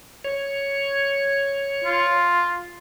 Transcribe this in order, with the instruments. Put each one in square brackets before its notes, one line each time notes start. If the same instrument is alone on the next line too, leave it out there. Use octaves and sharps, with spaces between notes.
[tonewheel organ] C#5
[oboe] F4